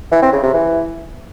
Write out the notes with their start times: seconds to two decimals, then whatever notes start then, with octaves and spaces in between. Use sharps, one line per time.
0.12 E3
0.22 C4
0.33 C#3
0.43 C3
0.53 E3